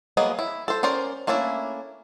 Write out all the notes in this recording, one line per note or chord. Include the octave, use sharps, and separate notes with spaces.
F#3 A#3 B3 G#4 D#5
E4
A4 C5
C#4 A#4 C5 D5
A3 A#3 C#4 D4 E4